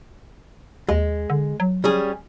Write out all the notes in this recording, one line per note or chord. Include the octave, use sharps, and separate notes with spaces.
D#2 G#3
D3
F#3
G3 C#4 G#4